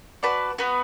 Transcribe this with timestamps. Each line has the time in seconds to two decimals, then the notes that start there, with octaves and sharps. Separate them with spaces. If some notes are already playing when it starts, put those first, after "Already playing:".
0.23 F#4 B4 D5 A5
0.58 B3 F#4 B4